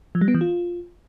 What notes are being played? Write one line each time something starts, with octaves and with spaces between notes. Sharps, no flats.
F3
G3
B3
E3
F4